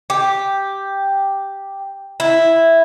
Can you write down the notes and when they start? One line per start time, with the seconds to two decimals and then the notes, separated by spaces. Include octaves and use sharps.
0.10 G4
2.20 E4